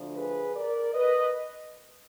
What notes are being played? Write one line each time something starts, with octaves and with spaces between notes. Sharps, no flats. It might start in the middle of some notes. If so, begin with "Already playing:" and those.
Already playing: D2 D3 F3
G#4 B4
A#4 D5
B4 D#5